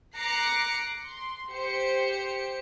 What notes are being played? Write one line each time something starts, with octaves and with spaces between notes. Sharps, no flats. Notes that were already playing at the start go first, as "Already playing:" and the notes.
A#5 D6 F#6 A#6 C7 C#7
C6
G4 C5 C#7